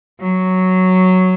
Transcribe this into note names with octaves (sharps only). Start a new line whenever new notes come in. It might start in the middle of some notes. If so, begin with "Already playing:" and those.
F#3